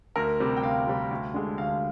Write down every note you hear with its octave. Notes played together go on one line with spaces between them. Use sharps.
D2 A#4
C3 G3
G5
D2 F5
C3 G3
D2
D3 G#3
D2 F5